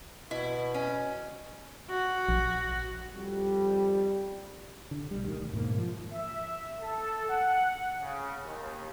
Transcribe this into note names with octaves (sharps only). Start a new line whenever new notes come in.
B2 E4
C#4
F#4
A#1
F2 G3
D3
B1 G3
D2 D#3
E1
G#2 B2 D#3 A#3
F3
E5
A4
F#5
C#3
D#2